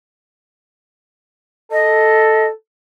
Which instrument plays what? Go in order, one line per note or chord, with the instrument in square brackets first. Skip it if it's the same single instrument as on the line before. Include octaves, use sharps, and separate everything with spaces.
[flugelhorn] A4 [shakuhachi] D#5